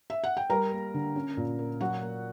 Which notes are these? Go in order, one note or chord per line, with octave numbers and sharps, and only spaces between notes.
E5
F#5
G5
G3 A#4 A#5
A#3
D3
C#4
A#2
A#3
F#3 F#4 F#5
A#3